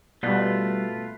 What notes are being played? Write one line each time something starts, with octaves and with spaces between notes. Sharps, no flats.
B2 G3 A3 F4 B4